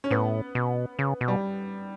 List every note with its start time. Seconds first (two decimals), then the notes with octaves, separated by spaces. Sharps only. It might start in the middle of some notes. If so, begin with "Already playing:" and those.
0.04 C#4
0.11 A2 B3
0.55 B2
0.99 C#3
1.21 B2
1.28 G3